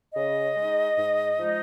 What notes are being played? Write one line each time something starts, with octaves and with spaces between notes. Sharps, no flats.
C#3 D#5
G#3 D#4
G#2
F3 G#3 D#4